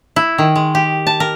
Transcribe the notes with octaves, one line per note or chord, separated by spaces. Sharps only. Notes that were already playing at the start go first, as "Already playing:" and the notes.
E4
D#3
G#3
G4
A5
A#4